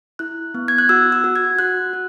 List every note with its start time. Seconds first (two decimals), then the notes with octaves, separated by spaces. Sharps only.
0.19 E4 F#6
0.54 B3
0.68 G#6
0.78 F#6
0.89 F#4 E6
1.12 E6
1.24 F#4
1.36 G#6
1.59 F#4 F#6
1.93 F#4